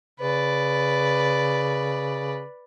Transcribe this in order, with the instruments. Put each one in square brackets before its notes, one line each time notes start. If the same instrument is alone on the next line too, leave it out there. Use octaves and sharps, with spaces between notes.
[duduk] C#3 [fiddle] B4 D5